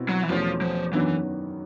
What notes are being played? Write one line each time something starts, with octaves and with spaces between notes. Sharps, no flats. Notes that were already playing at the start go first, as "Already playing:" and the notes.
Already playing: B2 C4 E4
F#3
E3
E2 B2 F3 F#3 A3 C#4
F3
F#2 D#3 E3 F#3 B3 D4